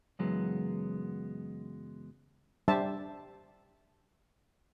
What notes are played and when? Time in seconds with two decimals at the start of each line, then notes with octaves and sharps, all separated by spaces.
0.19 F#2 C#3 E3 F#3 G#3 B3
2.68 G3 D4 G4 C5 E5 A5